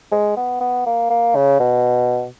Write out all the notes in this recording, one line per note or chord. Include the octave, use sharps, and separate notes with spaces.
G#3
B3
B3
A#3
A#3
C#3
B2